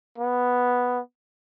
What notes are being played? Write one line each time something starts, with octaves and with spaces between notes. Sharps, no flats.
B3